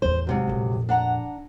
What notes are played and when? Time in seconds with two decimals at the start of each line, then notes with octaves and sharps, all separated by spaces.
0.02 A1 E2 C5
0.27 G#2 C3 F#3
0.47 A#1 F2
0.89 D4 F#5 A#5